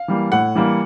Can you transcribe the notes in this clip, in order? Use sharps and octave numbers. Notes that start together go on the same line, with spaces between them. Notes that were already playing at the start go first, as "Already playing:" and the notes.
Already playing: F5
E3 G3 A#3
A2 F#5
E3 G3 A#3